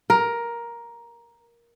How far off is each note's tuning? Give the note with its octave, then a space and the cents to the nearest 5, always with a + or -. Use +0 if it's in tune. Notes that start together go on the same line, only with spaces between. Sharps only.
A#4 +10